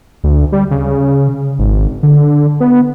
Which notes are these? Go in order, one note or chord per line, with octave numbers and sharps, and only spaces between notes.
D2
G3
C#3
G#1
D3
B3